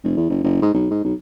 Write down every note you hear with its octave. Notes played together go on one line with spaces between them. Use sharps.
F1
E2
F#1
F#1
G#2
B1
G#2
B1